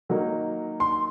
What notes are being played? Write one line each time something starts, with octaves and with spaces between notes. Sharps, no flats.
D#3 F#3 A#3 D#4
C6